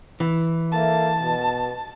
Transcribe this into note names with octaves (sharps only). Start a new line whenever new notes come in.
E3
A#3 A4 E5 A5
B2